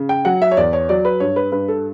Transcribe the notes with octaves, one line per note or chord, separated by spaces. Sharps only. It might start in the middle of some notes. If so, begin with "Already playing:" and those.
Already playing: C#3
G5
F#3 F#5
E5
C#5
E2 D5
C#5
F#3 D5
B4
G2 C#5
B4
G2 B4
A4